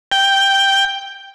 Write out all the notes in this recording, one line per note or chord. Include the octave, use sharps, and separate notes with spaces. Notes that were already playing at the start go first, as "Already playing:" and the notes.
G5